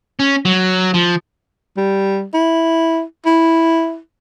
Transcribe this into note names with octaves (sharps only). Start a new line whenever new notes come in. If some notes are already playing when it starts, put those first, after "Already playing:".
C#4
F#3
F3
G3
E4
E4